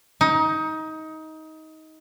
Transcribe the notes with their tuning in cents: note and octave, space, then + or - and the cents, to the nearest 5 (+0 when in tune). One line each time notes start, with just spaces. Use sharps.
D#4 +20